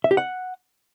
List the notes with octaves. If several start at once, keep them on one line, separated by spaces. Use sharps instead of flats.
E5
G4
F#5